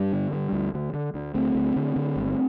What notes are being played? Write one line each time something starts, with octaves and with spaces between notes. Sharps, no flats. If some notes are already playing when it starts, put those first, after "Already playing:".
Already playing: G2
D3
G2
D2
D2
D3
D2
D2 A3 C4
D2
D3
D3
G1